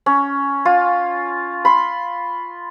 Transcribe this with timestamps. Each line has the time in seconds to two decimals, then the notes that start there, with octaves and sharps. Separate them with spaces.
0.06 C#4
0.65 F4
1.65 B5 C6